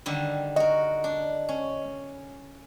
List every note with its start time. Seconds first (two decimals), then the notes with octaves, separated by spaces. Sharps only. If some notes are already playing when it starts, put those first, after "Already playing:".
0.06 D3 D#3 G3
0.56 F#4 A#4 D#5
1.04 D4
1.49 C#4